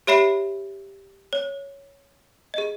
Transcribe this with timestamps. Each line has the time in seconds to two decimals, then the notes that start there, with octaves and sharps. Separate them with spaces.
0.07 G4 C#5 E5 B5 C7 D7
1.33 C#5
2.54 G#4 D#5